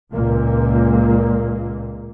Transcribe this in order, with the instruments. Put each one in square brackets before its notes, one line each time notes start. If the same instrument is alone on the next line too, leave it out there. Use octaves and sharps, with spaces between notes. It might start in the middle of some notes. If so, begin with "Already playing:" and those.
[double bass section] C#2 A#2 A#3